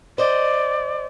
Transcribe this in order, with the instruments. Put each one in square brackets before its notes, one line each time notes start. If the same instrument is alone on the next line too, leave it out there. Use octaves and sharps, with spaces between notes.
[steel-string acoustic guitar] C5 D#5 [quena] D5